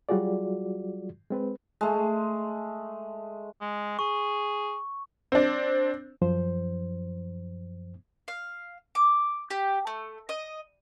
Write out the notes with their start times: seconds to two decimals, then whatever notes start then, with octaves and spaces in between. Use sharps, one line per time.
0.09 F#3 G3 F4 F#4 G#4 D5
1.30 G#3 C4 B4
1.81 G#3 A3
3.61 G#3
3.99 G#4 C#6
5.32 C4 D4
6.22 F#2 F3 C5
8.28 F5
8.95 D6
9.51 G4
9.87 A3
10.29 D#5